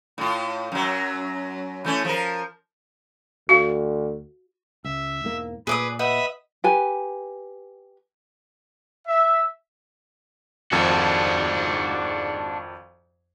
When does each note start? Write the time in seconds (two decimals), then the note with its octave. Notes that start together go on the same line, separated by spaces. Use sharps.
0.18 A2 F4
0.72 F#2 F#3
1.85 E3 A3 C#4
2.05 F3 A#4
3.49 D2 F#4 F5
4.84 C#2 E5
5.24 E1 G#2 A#3
5.67 A#2 G#4 B4 D5 D#6
5.99 B4 D#5 E5 F#5 B5 D#6
6.64 G4 B4 G#5
9.08 E5
10.72 G#1 F2 G#2 D4 F#4